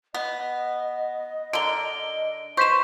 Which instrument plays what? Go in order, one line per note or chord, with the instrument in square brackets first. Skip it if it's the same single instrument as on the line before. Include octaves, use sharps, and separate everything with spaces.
[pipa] B3 [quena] D#5
[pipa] D3 A#4 [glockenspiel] D7 G7
[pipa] B4 C5 [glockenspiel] C#6 B6 E7